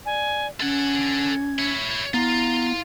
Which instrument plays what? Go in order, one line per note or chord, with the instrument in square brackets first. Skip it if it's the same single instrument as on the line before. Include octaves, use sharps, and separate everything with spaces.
[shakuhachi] D5 [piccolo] G#5
[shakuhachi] C#4 [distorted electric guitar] A4 F#5 [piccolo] G#6
[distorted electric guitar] E4 C#5
[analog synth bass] B3 [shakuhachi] E4 [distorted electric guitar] F4 [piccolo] A#5